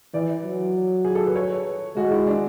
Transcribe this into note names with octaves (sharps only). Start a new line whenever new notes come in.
E3 D5
F#3
G#4
A4
B4
C#5
G#3 F#4
E4
D4